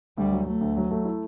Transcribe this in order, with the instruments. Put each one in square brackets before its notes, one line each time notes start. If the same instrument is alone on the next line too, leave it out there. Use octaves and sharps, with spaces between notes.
[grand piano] D2 [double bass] G3
[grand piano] F#3
[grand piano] F#3 [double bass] A3
[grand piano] D2
F#3
A3
E4